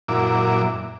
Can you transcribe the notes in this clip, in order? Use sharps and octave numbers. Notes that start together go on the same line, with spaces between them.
F#2 A#2 E4 D6